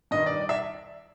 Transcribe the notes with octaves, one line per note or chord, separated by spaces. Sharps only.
G2 D#3 D#5
D5
D5
E5